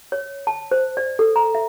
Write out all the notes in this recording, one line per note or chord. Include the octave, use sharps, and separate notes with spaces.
C#5
A5
C5
D5
A4
A#5
E5